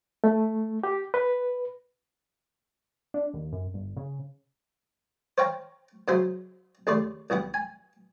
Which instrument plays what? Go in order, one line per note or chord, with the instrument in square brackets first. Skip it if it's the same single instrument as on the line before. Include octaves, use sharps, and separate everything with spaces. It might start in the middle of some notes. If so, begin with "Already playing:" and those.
[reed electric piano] A3
G4
B4
[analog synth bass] D4
D#2
F#2
G1
C#3
[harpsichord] C5 C#5 F5 G5 A#5
C#3 F#3 F4 C5 E5 C6
D#2 C#3 A3 D5 C6
C2 E3 B3 F#5
G#5